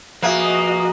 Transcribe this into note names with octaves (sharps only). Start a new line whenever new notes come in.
F3 A#3 F#4 G#4 B4 D#5 E5 G#5